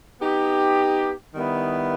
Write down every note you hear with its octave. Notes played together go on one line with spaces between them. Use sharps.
B3 D#4 G4
D#3 G3 B3 E4 A#4